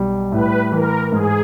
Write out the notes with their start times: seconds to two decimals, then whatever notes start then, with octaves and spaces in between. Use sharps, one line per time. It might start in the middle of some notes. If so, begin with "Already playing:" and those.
Already playing: B1 G3
0.32 A2 B4
0.72 E3 A#4
1.12 G#2 G#4